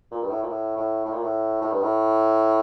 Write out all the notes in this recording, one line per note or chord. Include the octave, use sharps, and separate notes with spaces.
A#2
G2
A2
A#2
A2
A2
A2
A#2
A2
A2
G2
A2